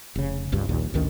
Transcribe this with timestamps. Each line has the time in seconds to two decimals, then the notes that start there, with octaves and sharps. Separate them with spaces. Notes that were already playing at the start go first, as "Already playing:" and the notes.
0.16 F1 C#3
0.52 G1 C#2 G2
0.69 A#1 D#2 A#2
0.94 A1 D2 D#3 C#4